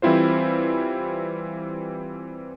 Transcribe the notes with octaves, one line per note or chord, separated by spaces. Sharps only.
E3 G3 C4 E4 F4 C5